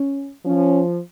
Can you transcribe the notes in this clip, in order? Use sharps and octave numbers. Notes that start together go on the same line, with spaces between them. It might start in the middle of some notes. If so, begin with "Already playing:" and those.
Already playing: C#4
F3 C#4